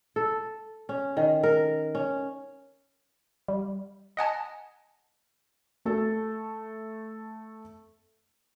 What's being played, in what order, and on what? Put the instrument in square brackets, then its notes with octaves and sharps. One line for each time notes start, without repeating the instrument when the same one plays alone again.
[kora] A4
C#4
D#3
A#4
C#4
[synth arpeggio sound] G3
D#5 F#5 G#5 A5
[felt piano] A3 A4